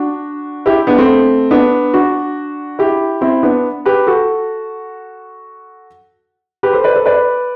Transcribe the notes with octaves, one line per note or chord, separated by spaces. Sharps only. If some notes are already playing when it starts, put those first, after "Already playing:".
Already playing: D4 F#4
E4 G4
B3 D4
A3 C4
B3 D4
D4 F#4
E4 G4
C4 E4
B3 D4
G4 B4
F#4 A4
G4 B4
A4 C5
B4 D5
A4 C5
B4 D5